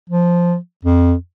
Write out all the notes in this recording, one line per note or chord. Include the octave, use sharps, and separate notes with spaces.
F3
F2